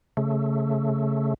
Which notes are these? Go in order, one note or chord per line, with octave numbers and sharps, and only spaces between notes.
C#3 A3